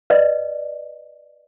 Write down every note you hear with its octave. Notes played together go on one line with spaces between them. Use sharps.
B4 D5 D#5